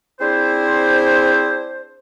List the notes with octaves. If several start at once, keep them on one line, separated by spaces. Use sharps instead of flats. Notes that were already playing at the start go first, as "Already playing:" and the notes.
C4 D4 E4 G#4 C5